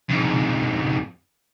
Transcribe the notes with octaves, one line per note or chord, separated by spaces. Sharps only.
F2 G#2